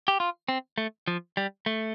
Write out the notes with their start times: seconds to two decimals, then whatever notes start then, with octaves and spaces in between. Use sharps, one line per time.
0.08 G4
0.20 F4
0.49 C4
0.78 A3
1.08 F3
1.37 G3
1.66 A3